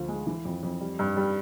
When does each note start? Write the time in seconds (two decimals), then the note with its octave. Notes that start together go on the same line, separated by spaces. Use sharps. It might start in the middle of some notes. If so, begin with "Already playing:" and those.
Already playing: D2 F3
0.08 G#3
0.27 E3
0.45 F2
0.63 F2
0.81 G3
0.99 G2
1.17 G3